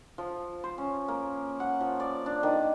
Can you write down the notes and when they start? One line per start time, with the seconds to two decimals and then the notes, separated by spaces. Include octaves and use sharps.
0.18 F3
0.64 C5
0.78 C#4
1.08 A#3
1.60 F#5
1.80 F3
2.00 D5
2.26 D4
2.43 D#3